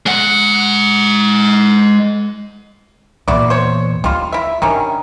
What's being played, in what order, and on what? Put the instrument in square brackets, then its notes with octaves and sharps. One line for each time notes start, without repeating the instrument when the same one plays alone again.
[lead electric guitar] G#3 F#5
[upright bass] E2 A#2 [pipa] E4 F#4 D5
[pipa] C5 C#5
[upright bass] D2 [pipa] G3 F4
[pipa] E4 E5
[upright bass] D3 [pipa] D#3 G3 C#4